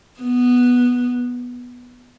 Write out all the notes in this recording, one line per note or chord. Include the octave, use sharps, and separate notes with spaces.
B3